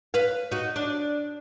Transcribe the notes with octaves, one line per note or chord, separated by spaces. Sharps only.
B4 F5
D#4 F#4
D4